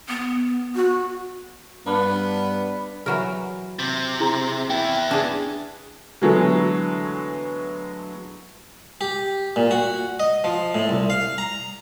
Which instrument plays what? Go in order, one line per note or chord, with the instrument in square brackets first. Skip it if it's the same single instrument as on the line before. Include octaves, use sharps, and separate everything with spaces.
[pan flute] B3
[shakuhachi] F#4
[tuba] G2 [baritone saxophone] B3 [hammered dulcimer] D4 B4 F5
[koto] E3 F#3 A#4
[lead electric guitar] C3
[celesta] E4 G#4 A#5
[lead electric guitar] B3 E4 [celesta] G5
[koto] D4 G#4
[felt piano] D3 E3 F#3 G#3 A3 B3
[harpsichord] G4
A#2
F#4
D#5
F3
A2
C2
F5
A#5